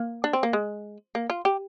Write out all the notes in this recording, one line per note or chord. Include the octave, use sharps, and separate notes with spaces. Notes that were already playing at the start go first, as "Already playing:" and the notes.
Already playing: A#3
D4
C4
A#3
G#3
A#3
F4
G4